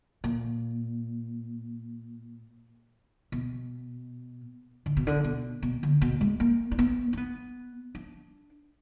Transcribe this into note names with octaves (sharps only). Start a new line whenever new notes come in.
A#2
B2
D3
B2
D3
B2
B2
D3
B2
G#3
A#3
D4
B3
D4
B3
D4